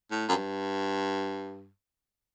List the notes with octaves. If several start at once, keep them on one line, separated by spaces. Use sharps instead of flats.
A2
F#2
G2